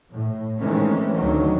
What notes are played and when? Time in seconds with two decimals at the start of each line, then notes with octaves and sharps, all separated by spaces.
0.11 A2
0.59 D#3 E3 G#3 A3 C4 C#4
1.14 D2 D#3 F#3